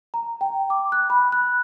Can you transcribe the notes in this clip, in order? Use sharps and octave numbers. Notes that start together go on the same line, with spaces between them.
A#5
G5
D6
F#6
B5
F#6